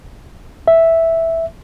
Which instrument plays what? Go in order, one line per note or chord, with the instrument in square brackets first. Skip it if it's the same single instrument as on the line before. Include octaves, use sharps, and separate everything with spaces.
[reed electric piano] E5